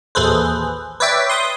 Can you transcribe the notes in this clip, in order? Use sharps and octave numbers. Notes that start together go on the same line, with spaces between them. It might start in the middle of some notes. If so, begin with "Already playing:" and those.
A1 D#2 G#4 A4 B4 C5
B4 C#5 D5 E5 G5
C6 D#6